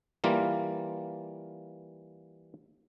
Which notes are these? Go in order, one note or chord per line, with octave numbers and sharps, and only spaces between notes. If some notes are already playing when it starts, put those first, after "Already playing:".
E3 G3 A#3 F4